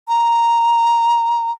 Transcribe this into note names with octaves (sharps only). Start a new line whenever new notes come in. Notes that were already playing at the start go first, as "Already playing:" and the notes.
A#5